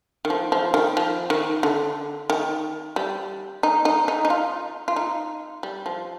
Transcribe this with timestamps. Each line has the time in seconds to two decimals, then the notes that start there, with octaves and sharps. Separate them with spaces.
0.25 D#3
0.30 F3
0.52 F3
0.74 D#3
0.97 F3
1.30 D#3
1.63 D3
2.30 D#3
2.96 G3
3.63 D#4
3.85 D#4
4.08 D#4
4.25 D#4
4.30 F4
4.88 F4
4.96 D#4
5.63 G3
5.86 F3